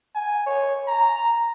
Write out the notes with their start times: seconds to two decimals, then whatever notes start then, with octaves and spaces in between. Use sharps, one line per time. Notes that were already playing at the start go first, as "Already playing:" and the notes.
0.15 G#5
0.46 C#5
0.88 A#5